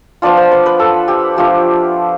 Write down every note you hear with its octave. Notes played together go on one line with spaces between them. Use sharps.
F3 B3 D4 F4 D5
C5
B4
B4
A4
G4
F3 A3 D4 F4 G4